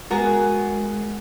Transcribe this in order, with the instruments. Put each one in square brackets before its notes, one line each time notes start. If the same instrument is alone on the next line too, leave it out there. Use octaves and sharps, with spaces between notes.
[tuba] G#3 [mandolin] B3 G#4 [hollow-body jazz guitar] F#4 A#4